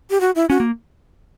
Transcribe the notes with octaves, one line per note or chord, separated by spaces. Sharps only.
G4
F#4
E4
C#4 F#4
A#3